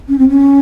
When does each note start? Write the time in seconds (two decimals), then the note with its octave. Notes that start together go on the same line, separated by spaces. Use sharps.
0.08 C#4
0.19 C4
0.29 C#4